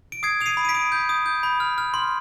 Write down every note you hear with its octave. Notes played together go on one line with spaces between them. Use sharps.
D7
D#6 G#6 C7
D#6 F7
C7 D#7
B5
D#7
B6 D7
D#6
G6
D#6
G6
B5
F6
F6
C6